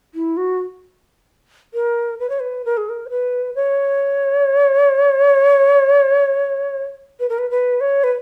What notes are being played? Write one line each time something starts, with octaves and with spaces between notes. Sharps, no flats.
E4
F#4
A#4
B4
C#5
B4
A#4
G#4
A#4
C#5
B4
C#5
B4
A#4
B4
B4
C#5
B4